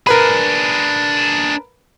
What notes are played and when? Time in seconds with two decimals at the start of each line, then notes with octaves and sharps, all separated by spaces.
0.07 D4 G#4 A#4 B4 B5